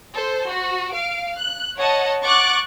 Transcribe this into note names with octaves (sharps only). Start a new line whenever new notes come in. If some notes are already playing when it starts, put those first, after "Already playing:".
A4 C5
F#4
F5 D7
F#6
C#5 D#5 F#5 A5
F#5 C#6 D6 F#6 A6